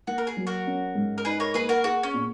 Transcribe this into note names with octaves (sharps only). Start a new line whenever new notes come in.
A#3 F#4
A#4
G#4
F#3
F#4 A#4
C#4
G#2
A#4
D#4 G#4 B4
A#4 C#5
A#3 G#4 B4
F#4 A#4
F#4 G#4
C#4
A#2